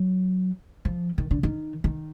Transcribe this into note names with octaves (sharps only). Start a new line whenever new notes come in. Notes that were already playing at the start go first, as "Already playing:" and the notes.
Already playing: F#3
F3
D#3
D3
D#3
D#3